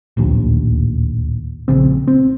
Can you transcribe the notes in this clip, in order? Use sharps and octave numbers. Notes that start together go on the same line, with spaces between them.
D1 A#1 D#2
A#1 C#3 C4
C4